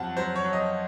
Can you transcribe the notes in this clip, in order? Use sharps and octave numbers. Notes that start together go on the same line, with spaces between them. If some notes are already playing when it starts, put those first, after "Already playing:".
Already playing: F2 F#3 F#5 A5
F#3 C5
C#5
F#3
D#5